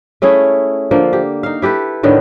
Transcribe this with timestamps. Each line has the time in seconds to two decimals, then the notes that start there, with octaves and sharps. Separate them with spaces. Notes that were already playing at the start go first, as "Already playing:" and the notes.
0.22 A3 C#4 E4 G#4
0.91 D3 F3 A#3
1.13 G4
1.43 D#4 F5
1.62 E4 G4 A4 B4
2.03 A2 D3 D#3 B3